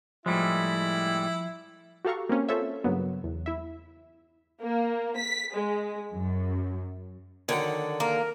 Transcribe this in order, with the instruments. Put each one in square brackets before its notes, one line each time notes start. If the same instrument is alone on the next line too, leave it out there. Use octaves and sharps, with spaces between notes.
[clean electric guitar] A2 G3 G#3 [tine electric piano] F3 [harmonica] E4
[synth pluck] F#4 G4 A4 F5 A#5 C#6
A#3 C4 C#4
F4 A4 C5 C#5 E5
G2 C#3 F#3 A#3 B3
E2
E4 E5
[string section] A#3
B6
G#3
F#2
[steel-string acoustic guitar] D3 [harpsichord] D#3 F#3 F#5
[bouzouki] A#3 [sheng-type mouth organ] A#4